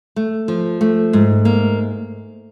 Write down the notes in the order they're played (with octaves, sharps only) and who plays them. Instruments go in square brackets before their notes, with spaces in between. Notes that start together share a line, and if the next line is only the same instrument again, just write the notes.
[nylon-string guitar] A3
F3
A3
G#2
A#3